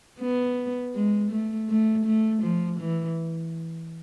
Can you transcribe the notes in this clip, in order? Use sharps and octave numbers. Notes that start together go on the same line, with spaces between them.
B3
G#3
A3
A3
A3
F3
E3